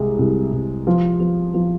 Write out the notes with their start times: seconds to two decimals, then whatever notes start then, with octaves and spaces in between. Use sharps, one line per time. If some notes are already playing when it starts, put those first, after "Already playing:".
Already playing: C2 G#3
0.19 C2
0.52 C2
0.87 F3
1.20 F3
1.54 F3